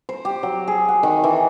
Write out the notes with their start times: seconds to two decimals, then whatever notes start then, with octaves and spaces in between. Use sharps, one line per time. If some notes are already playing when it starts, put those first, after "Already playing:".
0.09 C5
0.25 G4
0.43 F#3
0.68 G#4
0.88 F#5
1.03 D#3
1.24 E3